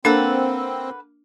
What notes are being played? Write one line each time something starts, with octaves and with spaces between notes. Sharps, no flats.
A#3 C4 D4 A4 B4 F#5